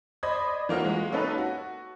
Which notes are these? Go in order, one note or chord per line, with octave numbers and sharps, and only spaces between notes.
C5 D5 D#5 B5 D#6 G#6
E3 A#3 F4 F#4 C5
G#3 F#4
A#3 C#4 D#4 A4 B4
F#4